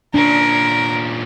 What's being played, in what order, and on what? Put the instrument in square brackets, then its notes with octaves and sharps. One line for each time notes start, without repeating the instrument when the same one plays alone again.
[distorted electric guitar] A#2 C#4 [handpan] D4 [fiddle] A#4